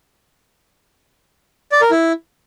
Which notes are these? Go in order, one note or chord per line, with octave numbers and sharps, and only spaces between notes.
D5
A#4
E4